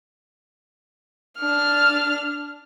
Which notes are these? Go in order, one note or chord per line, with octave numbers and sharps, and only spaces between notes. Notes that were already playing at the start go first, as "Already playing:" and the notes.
D4 F6